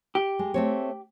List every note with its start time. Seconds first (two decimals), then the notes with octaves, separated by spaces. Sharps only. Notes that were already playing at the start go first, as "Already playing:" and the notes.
0.15 G4
0.39 G#3
0.54 A3 C4 C#5